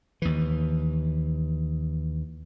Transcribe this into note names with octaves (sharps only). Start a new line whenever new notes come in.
D#2 E3